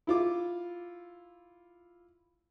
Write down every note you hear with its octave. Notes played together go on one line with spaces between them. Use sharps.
E4 F4 D6